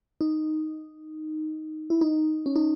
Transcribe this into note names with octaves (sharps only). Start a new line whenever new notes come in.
D#4
E4
D#4
C#4
D#4